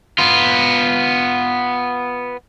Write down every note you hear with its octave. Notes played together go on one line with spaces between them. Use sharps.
B3 F4